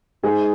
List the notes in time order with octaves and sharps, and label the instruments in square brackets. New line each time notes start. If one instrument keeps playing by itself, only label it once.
[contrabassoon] G#2 [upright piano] G#4